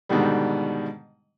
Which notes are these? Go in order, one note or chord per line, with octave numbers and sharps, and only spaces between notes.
G#2 B2 D3 D#3 G3